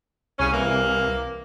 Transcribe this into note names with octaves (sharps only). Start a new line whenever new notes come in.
C2 C#3 C#4
E3 A#3